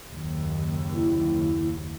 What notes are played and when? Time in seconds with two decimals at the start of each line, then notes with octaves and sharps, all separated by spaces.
0.11 F#1 D#2
0.94 E4